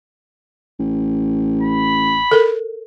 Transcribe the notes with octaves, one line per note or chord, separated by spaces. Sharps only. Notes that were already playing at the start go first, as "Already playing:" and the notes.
A1
B5
A4 A#4